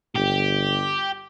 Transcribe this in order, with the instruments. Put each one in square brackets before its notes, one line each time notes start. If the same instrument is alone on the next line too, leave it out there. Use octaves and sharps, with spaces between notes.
[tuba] G1 [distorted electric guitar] G4